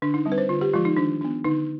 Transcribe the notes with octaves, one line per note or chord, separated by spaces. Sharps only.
D3 D4
D#4
G3 C4
B4
C5
D3 F4
G4
F3 G#3 F4
D#4
D#3 D4
B3 D4
D3 D#4